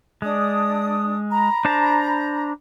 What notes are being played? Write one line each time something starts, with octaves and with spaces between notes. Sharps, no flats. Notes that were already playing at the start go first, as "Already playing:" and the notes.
G#3 D4 D#6
A#5 B5
D4 C5 A5